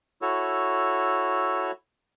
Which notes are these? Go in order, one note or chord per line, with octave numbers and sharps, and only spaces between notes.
E4 F#4 A4 C#5